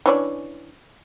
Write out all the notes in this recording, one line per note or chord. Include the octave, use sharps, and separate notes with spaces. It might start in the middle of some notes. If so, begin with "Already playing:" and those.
E3 C#4 D4